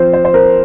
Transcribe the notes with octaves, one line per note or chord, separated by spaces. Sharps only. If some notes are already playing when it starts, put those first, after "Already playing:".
Already playing: F3 C4 C5
C5
C5
C4 A#4